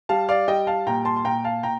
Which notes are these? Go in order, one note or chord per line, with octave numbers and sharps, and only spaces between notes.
G3 F5 A5
D5 F5
G3 D#5 G5
F5 A5
A#2 G5 A#5
A5 C6
C6
A#2 G5 A#5
F5 A5
A#2 G5 A#5